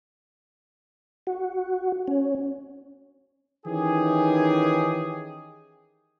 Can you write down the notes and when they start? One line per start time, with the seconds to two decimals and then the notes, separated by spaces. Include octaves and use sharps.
1.27 F#4
2.08 C#4
3.66 D#3 E3 C#4 D#4 G4 G#4